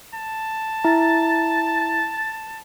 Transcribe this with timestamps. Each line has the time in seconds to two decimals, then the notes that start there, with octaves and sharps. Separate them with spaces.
0.14 A5
0.84 E4 E5 A#5 A6